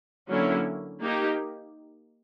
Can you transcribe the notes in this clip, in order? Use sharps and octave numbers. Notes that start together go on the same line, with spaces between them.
D3 F#3 A#3 C#4 E4
A#3 D#4 G4